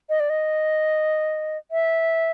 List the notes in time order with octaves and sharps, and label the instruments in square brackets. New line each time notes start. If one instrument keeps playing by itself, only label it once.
[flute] D#5
D5
D#5
E5